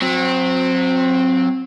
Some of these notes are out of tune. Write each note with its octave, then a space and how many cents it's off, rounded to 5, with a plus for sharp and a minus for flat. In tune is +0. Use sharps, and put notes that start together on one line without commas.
F#3 -30 C4 +0